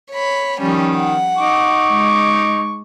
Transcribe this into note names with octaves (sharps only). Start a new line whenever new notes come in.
C#5 B5
D#3 F3 G3 C#4
F#5
D#4 C#6 D6
G#3